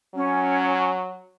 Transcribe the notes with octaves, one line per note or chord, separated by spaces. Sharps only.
F#3 C#4